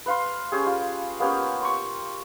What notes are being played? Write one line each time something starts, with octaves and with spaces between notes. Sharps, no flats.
B4 F5 C6
C#4 G4 G#4
F4
A#3 B3 C#4 G4
C6 C#6